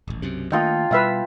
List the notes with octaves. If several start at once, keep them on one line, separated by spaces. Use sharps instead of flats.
D#1 A1
B1 F#2 C3
D#3 A3 A#3 F4 A4 D#5 G5
B2 G3 B4 E5 F5